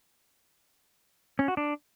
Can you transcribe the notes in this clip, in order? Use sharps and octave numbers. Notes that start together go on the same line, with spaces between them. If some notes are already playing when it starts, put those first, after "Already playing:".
C#4
F#4
D4